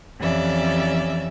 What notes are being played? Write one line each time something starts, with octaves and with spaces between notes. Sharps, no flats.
F2 E3 C#4 G4 D5 E5